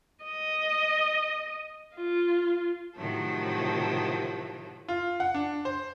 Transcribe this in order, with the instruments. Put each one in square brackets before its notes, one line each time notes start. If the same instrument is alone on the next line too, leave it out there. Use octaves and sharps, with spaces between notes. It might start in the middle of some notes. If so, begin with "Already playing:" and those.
[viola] D#5
F4
[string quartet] A2 C3 D#3 F3 F#3 A3
[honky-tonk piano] F4
F#5
D4
C5